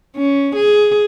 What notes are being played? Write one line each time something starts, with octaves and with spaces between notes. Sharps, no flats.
C#4
G#4